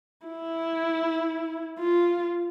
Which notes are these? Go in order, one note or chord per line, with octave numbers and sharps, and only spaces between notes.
E4
F4